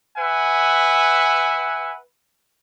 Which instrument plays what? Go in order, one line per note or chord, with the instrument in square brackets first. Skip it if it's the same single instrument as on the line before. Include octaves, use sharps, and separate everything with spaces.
[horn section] B4 E5 F#5 G#5